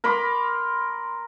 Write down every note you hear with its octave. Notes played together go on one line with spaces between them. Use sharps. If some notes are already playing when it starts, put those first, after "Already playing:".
A#4 B5 C6 D6